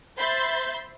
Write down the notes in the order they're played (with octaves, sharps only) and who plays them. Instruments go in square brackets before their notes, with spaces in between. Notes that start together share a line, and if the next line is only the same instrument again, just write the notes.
[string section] C5 E5 B5 C6 G6 A6